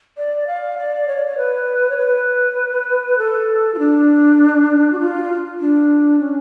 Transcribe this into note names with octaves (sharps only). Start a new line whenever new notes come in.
D5
F5
D5
C#5
D5
C#5
B4
C#5
B4
A4
F4
D4
F#4
F4
D4
C#4